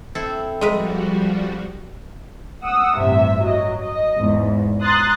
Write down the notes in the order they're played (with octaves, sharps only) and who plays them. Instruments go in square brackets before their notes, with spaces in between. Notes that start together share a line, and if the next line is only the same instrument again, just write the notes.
[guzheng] C4 E4 A4
[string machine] F3 G3 F#4 [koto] G#3 A#4 B4
[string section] F#5 D#6 E6
A1 G2 C3 E5
F#3 D#5
D#5
E2 G#2
A#5 C6 D#6 F#6 A6